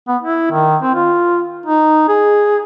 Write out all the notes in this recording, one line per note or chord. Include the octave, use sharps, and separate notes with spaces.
B3
E4
D#3
C4
F4
D#4
G#4